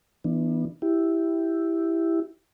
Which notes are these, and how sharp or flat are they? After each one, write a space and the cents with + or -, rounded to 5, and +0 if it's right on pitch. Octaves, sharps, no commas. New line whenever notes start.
E3 +0 B3 -15 D4 +30
E4 +0 G4 +0